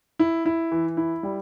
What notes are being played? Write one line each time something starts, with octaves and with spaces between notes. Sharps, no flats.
E4
E4
E3
E4
G3